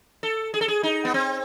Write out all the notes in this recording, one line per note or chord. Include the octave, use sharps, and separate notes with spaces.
A4
G#4
A4
G#4
D#4
B3
C4